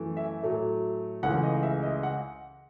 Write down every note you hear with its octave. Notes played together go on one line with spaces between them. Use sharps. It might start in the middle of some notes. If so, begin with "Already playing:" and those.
Already playing: F#2 E3 A3
E5
A2 F#3 A3
C#2 C#3 E3 A3 F#5
D#5
E5
D#5
F#5